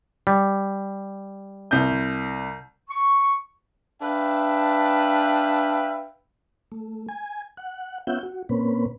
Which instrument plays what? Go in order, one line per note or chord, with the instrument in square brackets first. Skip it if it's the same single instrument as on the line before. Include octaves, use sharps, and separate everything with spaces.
[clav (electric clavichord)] G3
[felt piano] C2 G6
[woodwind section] C#6
[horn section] D4 B4 E5 F5 G5
[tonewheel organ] A3
G#5
F#5
B3 C#4 F4 E5 F#5 G6
F#4
A#2 A#3 C4 C#4 B4